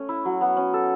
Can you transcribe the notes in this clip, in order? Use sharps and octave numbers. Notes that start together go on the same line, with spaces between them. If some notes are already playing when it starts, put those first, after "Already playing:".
Already playing: A3 C#4
E4
F#3
B3
C#4
A4